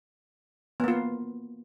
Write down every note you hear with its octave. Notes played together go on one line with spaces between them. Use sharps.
A#3 B3 F4